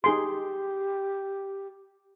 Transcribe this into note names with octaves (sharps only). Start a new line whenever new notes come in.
D#4 G4 G#4 C6